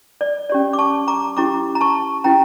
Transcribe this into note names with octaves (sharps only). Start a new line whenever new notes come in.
D5
C#4 G4 C#5 D5
D6
A5 C#6
A#5 D6
C#4 E4 G4 A#5 D6
A#5
A5 C#6
C#4 E4 G4 G5 A#5